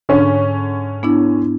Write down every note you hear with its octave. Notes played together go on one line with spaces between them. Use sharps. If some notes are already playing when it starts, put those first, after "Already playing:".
G#2 D3 C#4
B3 D4 E4